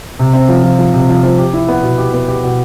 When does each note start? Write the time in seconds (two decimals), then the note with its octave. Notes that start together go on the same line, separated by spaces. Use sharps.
0.19 C3
0.33 C4
0.49 F3
0.64 F3
0.79 F3
0.94 C3
1.09 F3
1.23 F3
1.38 G4
1.53 E4
1.69 B3
1.83 B2
1.98 G4
2.14 B3
2.28 G4
2.43 B2